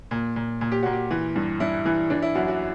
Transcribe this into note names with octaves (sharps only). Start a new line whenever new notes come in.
A#2
A#2
A#2
G4
A#2 F#4
G4
E3
G2
G2 E4
E3
E3 D4
E4
F#2 F#4
F#4